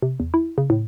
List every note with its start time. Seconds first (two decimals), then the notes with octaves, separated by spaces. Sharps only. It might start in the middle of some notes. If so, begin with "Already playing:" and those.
0.02 C3
0.20 E2
0.34 E4
0.58 C#3
0.70 A2